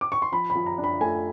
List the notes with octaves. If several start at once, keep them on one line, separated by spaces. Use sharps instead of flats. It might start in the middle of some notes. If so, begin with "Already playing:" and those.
D6
C#6
C6
F3 B5
B5
F3
A#5
D4
B5
A3 G#5